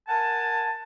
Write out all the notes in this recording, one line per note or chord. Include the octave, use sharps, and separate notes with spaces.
A#4 F#5 G#5 A5